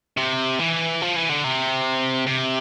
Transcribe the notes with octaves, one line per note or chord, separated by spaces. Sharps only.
C3
E3
F3
E3
D3
C3
C3